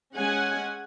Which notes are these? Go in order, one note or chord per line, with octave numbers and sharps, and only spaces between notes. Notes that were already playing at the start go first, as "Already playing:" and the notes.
G#3 C#4 F#5 G#5